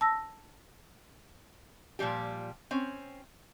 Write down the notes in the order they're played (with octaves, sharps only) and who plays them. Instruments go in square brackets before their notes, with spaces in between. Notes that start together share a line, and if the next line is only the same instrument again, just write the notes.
[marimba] A5 E6 A#6
[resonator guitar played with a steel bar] A#2 F3 G3 G4
C4 C#4